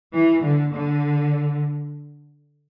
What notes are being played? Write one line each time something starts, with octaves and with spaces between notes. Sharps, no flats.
E3
D3
D3